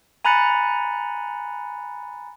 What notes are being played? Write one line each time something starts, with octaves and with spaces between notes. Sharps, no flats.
G#5 A#5 B5 F#6 A6 C#7